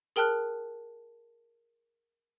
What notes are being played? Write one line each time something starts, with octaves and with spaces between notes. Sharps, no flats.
G#4 A#4 G5 A5 F6 F#6